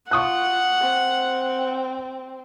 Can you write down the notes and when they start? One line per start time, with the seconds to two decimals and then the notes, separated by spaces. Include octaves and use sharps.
0.11 F4 F#5 C#6 D#6 F#6
0.81 C4